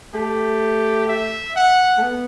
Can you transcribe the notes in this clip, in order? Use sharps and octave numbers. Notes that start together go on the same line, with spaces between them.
A3 G4
E5
F#5
A3
B3